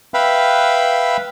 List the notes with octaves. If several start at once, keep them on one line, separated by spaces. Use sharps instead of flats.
B4 E5 F5 G5 B5